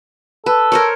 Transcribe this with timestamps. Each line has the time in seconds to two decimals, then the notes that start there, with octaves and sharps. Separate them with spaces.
0.46 A4 B4
0.72 A#4 C5 C#5